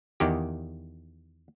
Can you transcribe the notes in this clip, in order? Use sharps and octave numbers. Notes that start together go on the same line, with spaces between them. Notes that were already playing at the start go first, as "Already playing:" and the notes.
E2 D#3 G4